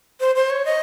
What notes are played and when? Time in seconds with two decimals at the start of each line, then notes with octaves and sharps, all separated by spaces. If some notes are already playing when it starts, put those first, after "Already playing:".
0.20 C5
0.35 C5
0.50 C#5
0.65 D#5